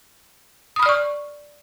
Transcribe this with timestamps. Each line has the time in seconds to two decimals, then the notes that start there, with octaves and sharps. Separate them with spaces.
0.76 D#6
0.79 B5
0.83 F6
0.86 D5
0.89 C#6